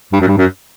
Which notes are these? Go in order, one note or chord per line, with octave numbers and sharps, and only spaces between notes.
G2
F#2
G2
F#2